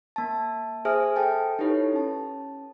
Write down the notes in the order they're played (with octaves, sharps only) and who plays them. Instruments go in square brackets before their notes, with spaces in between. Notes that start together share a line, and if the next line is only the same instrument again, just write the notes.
[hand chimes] A#3 A5
G#4 C5 E5 G#5 D#6 F6
A4 G5 A5
D#4 E4 G4 A4 B4 C#5
C#4 A5